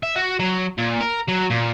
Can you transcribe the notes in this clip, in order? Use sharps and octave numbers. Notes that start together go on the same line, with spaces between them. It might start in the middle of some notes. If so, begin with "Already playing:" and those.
E5
F#4
F#3
A#2
A#4
F#3
A#2